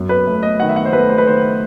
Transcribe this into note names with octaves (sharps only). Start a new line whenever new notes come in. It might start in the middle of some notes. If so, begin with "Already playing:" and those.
Already playing: F#2
B4
A3
D#5
D#3 F#5
E5
F#5
C5
A3 B4
C5
B4
D#3 C5